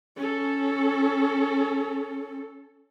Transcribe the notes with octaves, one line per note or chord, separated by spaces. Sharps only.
C#4 A4